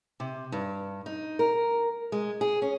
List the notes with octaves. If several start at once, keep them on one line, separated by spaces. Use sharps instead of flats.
C3
G2
D#4
A#4
G#3
G#4
C#4